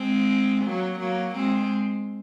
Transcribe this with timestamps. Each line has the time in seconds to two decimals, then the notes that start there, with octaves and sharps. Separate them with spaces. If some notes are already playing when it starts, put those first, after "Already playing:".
Already playing: G#3 C4
0.64 F#3 A#3
0.99 F#3 A#3
1.35 G#3 C4